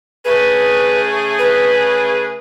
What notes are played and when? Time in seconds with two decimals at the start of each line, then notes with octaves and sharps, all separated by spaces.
0.25 C#3 A3 G#4 B4
1.39 B4